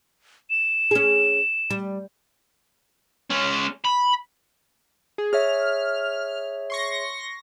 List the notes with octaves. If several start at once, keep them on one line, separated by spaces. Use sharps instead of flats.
E7
C#4 G#4
G3
G#3 C#4
B5
G#4
G#4 C#5 E5 F6
C6 C#6 A#6